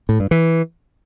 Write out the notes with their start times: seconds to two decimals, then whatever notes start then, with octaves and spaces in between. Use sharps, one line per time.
0.09 A2
0.20 G2
0.31 E3